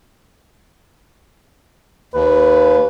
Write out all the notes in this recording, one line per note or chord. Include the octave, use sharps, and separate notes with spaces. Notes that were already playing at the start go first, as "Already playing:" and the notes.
D#2 B4